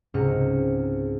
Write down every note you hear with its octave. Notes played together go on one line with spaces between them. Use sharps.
C#2 G#2 C3 G#3 F6 C#7